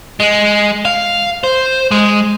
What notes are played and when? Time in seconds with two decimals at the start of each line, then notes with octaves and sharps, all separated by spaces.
0.20 G#3
0.85 F5
1.44 C5
1.91 G#3